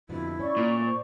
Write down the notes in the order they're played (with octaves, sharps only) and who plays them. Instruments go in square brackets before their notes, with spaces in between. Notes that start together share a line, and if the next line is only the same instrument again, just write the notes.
[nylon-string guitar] F2 B2 D3 [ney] E4
[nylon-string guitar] C#4 [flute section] D5 C#6
[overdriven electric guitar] A#2
[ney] A3
C5